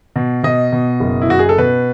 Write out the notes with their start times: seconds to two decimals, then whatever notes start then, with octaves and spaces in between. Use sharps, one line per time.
0.16 B2
0.43 B2 D#5
0.72 B2
1.00 F#1
1.21 E4
1.29 F#1 F#4
1.39 G#4
1.49 A4
1.58 B2 B4